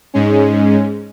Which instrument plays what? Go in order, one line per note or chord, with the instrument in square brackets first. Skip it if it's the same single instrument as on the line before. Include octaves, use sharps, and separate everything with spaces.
[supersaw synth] G#2 G#3 C#4